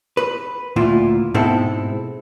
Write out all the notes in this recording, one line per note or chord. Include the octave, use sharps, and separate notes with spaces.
B4
D2 A#2 E4 F4
G#2 B2 G#3 C4 E4 A4